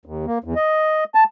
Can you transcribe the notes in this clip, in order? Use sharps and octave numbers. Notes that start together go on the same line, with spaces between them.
D#2
A#3
E2
D#5
A5